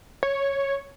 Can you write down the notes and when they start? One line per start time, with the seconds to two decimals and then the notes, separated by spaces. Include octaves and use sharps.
0.23 C#5